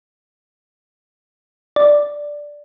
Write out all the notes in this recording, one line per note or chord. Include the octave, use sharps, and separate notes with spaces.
D5